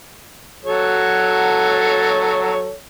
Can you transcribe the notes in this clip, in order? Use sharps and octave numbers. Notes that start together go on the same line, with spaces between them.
F#3 A4 C#5